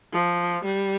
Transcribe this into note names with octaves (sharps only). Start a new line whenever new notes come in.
F3
G3